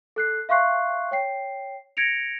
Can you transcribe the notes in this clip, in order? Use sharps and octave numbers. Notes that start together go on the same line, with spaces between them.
A4 F#6 C7
E5 F5 C6 C#6 F#6 C7
C#5 G5 C7
G#6 A#6 C#7 D7 F7